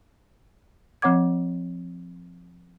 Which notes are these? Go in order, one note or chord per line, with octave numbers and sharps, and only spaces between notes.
F3 C4 C#5 F#5 D6 G#6